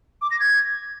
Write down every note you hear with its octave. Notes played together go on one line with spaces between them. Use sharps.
D6
A#6
G#6